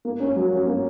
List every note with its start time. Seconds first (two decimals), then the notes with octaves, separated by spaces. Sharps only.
0.05 A#3
0.20 C#4
0.36 F#3
0.51 F#3
0.66 A#3